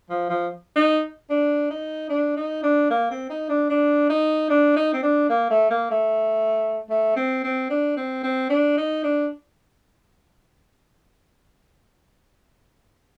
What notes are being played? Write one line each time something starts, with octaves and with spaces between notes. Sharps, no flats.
F3
F3
D#4
D4
D#4
D4
D#4
D4
A#3
C4
D#4
D4
D4
D#4
D4
D#4
C4
D4
A#3
A3
A#3
A3
A3
C4
C4
D4
C4
C4
D4
D#4
D4